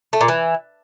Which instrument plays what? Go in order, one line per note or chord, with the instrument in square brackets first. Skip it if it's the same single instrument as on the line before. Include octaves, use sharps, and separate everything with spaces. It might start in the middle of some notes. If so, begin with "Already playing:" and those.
[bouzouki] A3
A#2
E3